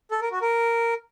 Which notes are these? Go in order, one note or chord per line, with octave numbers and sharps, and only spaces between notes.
A4
A#4
F#4
A#4